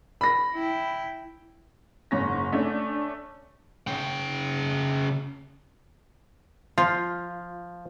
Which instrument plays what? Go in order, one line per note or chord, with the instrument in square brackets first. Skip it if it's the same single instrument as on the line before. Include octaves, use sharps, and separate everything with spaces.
[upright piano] B5 A#6
[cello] E4 G5
[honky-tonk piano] F#1 G#2 C#4 A#6
A3 C#4 D4
[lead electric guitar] C#3 G5
[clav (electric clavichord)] F3 [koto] F4